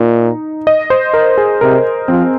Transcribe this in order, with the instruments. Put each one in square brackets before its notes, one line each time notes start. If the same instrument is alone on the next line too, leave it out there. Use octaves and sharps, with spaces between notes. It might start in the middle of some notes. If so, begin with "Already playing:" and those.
Already playing: [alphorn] A#2 [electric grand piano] D#4
[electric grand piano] D#5
C5
A#4
G#4
[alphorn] C3 [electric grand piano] A#4
[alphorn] F3 [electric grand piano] C4